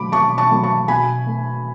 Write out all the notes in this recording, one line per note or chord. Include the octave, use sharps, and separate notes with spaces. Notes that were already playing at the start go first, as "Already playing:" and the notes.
Already playing: B2 F#3 A3 B5 D6
B2 A5 C#6
A5 C#6
F#3 A3
A5 C#6
B2 G#5 B5
A3